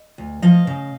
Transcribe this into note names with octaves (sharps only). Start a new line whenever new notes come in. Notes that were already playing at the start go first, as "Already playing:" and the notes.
Already playing: D#5
D2
F3 D#5 F5
C#3